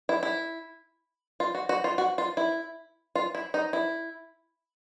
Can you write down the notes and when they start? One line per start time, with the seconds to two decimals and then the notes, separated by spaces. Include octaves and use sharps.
0.09 E4
0.23 E4
1.40 F4
1.55 F#4
1.69 F#4
1.84 F4
1.98 F#4
2.18 F4
2.37 E4
3.15 F4
3.35 E4
3.54 D#4
3.73 E4